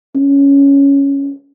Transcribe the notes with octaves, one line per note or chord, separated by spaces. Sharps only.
C#4